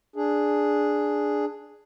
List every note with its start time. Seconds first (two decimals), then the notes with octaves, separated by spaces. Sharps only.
0.16 D4 G#4